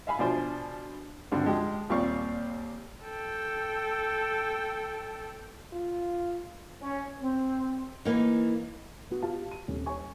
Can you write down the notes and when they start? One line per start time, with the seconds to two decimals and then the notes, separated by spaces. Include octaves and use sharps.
0.07 E5 F5 G#5 B5
0.19 B2 F3 D4 F4 C5 G#5
1.32 C#2 G2 D3 C4
1.44 F3 G#3 G4
1.89 D#2 A#2 G3 C4 F5 C#6
3.05 A4 G5
5.73 F4
6.82 C#4
7.21 C4
8.05 E3 A#3 D#4
9.11 B3 F#4
9.22 F4 G4 F5 A5
9.51 D#7
9.68 D#1 C3 C#4
9.86 C#5 G#5 C#6